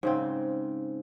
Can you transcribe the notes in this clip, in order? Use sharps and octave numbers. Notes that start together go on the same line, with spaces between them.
G#2 C#3 C4